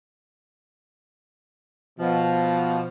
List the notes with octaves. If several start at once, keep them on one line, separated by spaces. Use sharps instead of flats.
B2 F3